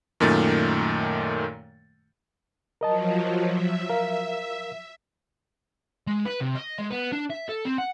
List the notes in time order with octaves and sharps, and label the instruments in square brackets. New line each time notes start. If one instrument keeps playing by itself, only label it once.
[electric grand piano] F#2 A#2 D#3 A3 A6
[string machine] F3 F#3 [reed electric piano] A#4 D#5 A5
[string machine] E5
[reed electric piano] A#4 F5
[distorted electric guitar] G#3
B4
C3
D#5
G#3
B3
D4
E5
A4
C4
F#5